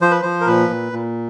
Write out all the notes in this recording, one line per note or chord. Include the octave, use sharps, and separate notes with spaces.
F3 C5
B4
F3 C5
A#4
A#2 B4
A#2
A#2